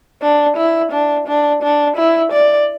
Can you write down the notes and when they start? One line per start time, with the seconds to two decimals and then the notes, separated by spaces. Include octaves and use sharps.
0.22 D4
0.57 E4
0.92 D4
1.27 D4
1.63 D4
1.97 E4
2.32 D5